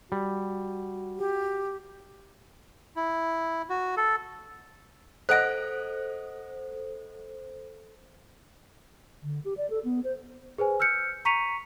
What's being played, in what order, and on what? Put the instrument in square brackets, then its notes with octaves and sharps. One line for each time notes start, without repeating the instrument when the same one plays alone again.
[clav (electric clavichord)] G3 [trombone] F#4
[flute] G4
[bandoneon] E4
F#4
A4
[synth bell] A4 C5 [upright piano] D#5 F#5 A#6 [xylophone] F#6 D7
[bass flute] D3
G4
D5
A4
B3
C5
[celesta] G#4 B4 C5 G#5
E6 F6 G6 C#7
A#5 C#6 B6 C#7 D#7 F7